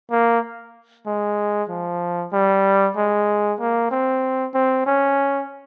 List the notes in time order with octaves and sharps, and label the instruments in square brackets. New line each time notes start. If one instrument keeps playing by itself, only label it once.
[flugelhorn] A#3
G#3
F3
G3
G#3
A#3
C4
C4
C#4